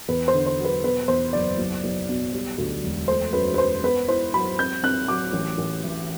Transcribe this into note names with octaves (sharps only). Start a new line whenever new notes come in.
E2 B4
C5
D3
C5
F#3
B4
B2 B4
E2 C5
F#1 D5
B1
B1
B2
G3
D2
E1
A3 C5
F#2 B4
B4
F#2 C5
B3 B4
E4 C5
F#3 B5
C4 G6
C4 F#6
F#3 D6
A1
A1
E3